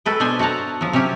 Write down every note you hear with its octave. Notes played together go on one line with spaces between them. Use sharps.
F#4 A4 B4 G5
B2 B3 D4 C5 G#5
F#4 A4 F#5 A5 A#5
F3 F#3
C3 F#3 C#4 G4